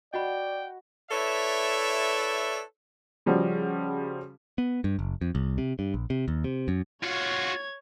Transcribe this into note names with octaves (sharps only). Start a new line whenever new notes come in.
F#4 D5 D#5 F#5 G5 B5
E4 A4 B4 C#5 D5 E5
C#3 F3 G3 C#4 F#4
B3
G2
F#1
F2
C2
C3
G2
A#1
C3
D#2
C3
F#2
F4 F#4 C#5 G#6